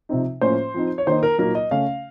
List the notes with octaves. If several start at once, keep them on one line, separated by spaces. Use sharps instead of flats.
C3 F3 C4 D#4
A2 F3 A#3 C#4 C5
F3 C4 D#4
C#5
D#3 A#3 D#4 C5
A#4
A#2 F#3 A#3 D#4 A#4
D#5
C#3 A3 C#4 F5